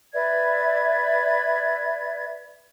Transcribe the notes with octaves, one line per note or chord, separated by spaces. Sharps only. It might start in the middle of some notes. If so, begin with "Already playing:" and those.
B4 D5 E5 G#6